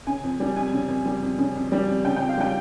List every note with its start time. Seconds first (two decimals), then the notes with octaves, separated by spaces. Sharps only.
0.07 C#3 G#5
0.23 F2
0.40 G3
0.56 F2 G#5
0.73 C#3
0.89 F2
1.06 G3
1.23 F2
1.38 C#3
1.55 F2
1.72 G3
1.87 F2
2.05 C#3 G5
2.16 G5
2.21 F2
2.29 F5
2.38 G3 G5